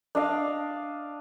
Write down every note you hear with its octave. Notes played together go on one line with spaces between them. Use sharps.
D4 D#5 F5